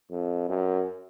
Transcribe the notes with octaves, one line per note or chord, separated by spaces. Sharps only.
F2
F#2